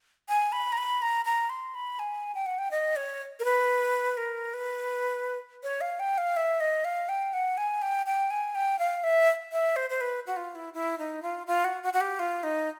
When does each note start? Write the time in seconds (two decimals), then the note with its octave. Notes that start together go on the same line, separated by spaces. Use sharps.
0.29 G#5
0.52 B5
0.72 A#5
0.77 B5
1.02 A#5
1.25 A#5
1.50 C6
1.75 B5
1.99 G#5
2.35 G5
2.46 F#5
2.58 G5
2.71 D#5
2.96 C#5
3.39 A#4
3.44 B4
4.17 A#4
4.54 B4
5.63 C#5
5.81 F5
6.00 G5
6.18 F5
6.36 E5
6.60 D#5
6.84 F5
7.09 G5
7.33 F#5
7.57 G#5
7.82 G5
8.06 G5
8.31 G#5
8.55 G5
8.79 F5
9.04 E5
9.52 E5
9.76 C5
9.90 C5
10.01 B4
10.27 F#4
10.37 F4
10.55 E4
10.74 E4
10.98 D#4
11.22 F4
11.47 F4
11.64 F#4
11.83 F#4
11.93 F#4
12.01 G4
12.19 F4
12.43 D#4